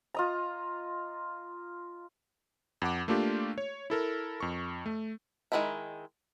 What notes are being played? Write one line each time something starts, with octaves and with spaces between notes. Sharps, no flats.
F4 D#5 A#5
F2 F#5 D6
A3 A#3 D4 F4 G4
C#5
E4 A4 A#4
F2 C#6
A3
D#3 G#3 E4 A#4 E5